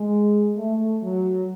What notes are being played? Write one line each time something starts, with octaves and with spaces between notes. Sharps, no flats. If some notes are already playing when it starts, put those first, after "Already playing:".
Already playing: G#3
A3
F#3